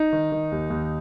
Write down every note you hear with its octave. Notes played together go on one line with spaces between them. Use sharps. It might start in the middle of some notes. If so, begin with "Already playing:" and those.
Already playing: D#4
D#3
D#3
D#2
D#2